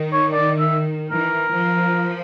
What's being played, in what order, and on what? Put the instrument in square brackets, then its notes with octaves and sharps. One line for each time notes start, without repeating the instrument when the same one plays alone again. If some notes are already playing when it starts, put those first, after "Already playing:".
Already playing: [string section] D#3
[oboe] C#5
D5
E5
[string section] E3 [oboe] A#4
[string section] F3